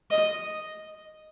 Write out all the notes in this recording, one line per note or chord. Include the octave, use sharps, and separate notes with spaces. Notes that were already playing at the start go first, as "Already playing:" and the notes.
D#5